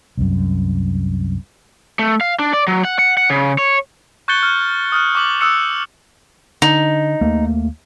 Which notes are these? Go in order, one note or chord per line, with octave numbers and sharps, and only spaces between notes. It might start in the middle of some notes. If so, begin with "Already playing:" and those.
C2 F#2
A3
F5
D4
D5
F#3
F#5
F#5
F#5
C#3
C#5
C#6 F#6 G6 A6 C#7 G7
F6
D#6 F6 F#6
C#6 D6 F#7
D#6 E6 F#6 C#7
D3 D#4
D#2 A3 A#3